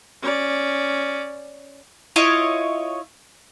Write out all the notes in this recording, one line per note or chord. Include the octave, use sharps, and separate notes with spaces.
C#4 D5
E4 F4 C#5 D#5